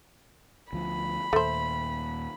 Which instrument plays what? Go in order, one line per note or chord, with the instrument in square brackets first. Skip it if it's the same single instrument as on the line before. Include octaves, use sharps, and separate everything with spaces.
[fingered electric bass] D2 F3 [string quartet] B5
[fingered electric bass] D#2 A#2 [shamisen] A3 C5